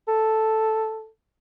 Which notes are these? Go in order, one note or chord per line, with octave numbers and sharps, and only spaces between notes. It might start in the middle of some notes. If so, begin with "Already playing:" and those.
A4